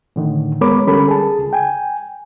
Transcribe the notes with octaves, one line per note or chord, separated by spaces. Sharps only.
A2 D3 D#3
G#3 B3 A#4 C#5 B5 D6
D3 G3 C#4 A4 A#4 B5
G#4 A5
C#2
G5 G#5